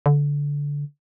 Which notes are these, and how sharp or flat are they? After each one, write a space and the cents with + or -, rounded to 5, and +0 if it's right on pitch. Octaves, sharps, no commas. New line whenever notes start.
D3 -20